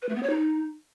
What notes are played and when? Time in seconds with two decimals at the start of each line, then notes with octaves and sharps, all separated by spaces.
0.02 B4
0.09 A3
0.16 B3
0.23 C#5
0.30 D#4